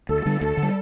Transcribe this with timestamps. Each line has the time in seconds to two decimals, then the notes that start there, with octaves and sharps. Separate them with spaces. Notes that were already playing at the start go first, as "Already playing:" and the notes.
0.09 D2 A4
0.26 D3 G3
0.41 D2 A4
0.57 D3
0.63 G3